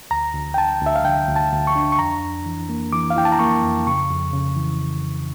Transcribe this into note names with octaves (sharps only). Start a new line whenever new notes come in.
D2 A#5
D2
G5
D3 A5
D2 E5
F5
D3 G5
D2
A5
D2
C#6
D4
C#6
F2 A#5
F2
E3
A#3
E3 D6
F5
E4 G5
A5
A#5
A#3 C#6
F2
C#3 C#6
F2
C#3
E3